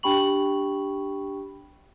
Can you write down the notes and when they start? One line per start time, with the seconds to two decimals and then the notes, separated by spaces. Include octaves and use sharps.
0.03 D4 G4 G5 B5 C#6 F#7